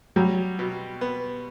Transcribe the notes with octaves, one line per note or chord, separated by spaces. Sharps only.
F#3 G3
B2
B3